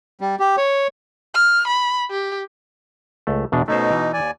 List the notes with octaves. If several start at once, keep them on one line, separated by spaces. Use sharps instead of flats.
G3
G4
C#5
F6
B5
G4
C#2 A3
E2 B2 D4
B2 A3 C#4 D#4 C5
E3
D#2 D5 G#5